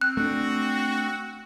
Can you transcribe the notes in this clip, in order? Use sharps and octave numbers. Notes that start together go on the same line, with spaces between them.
C4 F#6
A3 D4 F#4